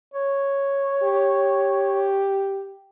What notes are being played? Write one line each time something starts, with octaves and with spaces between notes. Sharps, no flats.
C#5
G4